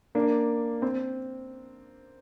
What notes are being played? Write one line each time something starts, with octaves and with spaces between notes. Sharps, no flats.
A#3 D4
C4